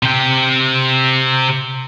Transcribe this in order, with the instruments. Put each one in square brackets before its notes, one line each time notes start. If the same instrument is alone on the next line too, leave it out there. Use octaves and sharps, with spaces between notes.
[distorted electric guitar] C3 G5